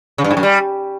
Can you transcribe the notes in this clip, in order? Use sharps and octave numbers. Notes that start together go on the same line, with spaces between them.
C#3
G2
G#2
F#2
G3